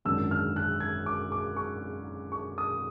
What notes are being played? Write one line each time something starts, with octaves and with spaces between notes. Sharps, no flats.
G#1 F#2 D3 E6
F6
F#6
G#6
D6
D6
C#6
C#6
D#6